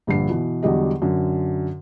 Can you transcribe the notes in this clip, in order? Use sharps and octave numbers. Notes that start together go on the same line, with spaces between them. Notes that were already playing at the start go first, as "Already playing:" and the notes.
A#1 G2 D3 C7
B2 E3
E2 D3 F#3 G3 D#5
F#2 D3